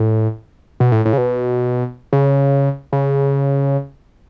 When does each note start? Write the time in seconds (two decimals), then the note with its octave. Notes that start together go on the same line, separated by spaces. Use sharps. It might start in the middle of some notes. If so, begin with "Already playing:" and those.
Already playing: A2
0.80 B2
0.92 A2
1.06 A2
1.13 C#3
1.18 B2
2.13 C#3
2.93 C#3